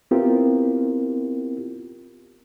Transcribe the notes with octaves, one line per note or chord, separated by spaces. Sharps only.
B3 C4 E4 F4 G4 A#4